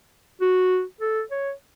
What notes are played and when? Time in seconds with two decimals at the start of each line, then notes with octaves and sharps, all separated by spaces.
0.41 F#4
1.01 A4
1.31 C#5